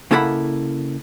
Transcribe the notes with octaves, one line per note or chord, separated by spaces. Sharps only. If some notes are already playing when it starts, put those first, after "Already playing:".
C#3 A#3 E4 A4 F#5 B5